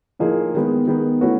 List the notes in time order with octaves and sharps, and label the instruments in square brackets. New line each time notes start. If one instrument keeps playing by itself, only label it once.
[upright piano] A2 F3 A#3 D#4 G#4
D#3 G#3 B3
D#3 G#3 B3
E3 A3 C#4 F#4 B4